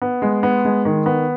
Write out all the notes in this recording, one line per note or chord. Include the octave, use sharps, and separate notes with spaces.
B3
G#3
B3
G#3
D#3
B3